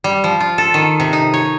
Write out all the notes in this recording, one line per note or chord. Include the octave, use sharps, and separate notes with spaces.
G3
F3
F4
A4
D#3
C3
D#4
C#5